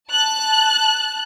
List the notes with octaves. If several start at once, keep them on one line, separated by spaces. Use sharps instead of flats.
A5 F#6